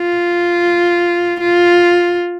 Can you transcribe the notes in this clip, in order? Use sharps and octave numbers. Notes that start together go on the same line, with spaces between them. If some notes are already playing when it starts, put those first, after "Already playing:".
Already playing: F4
F4